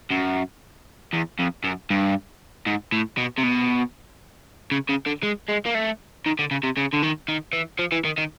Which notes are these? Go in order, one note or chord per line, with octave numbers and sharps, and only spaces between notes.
F#2
E2
F2
F#2
G2
G#2
A2
B2
C3
B2
C#3
C#3
D3
G#3
G#3
A#3
A3
D#3
D3
C#3
C3
C#3
D3
D#3
D#3
E3
F3
E3
D#3
D#3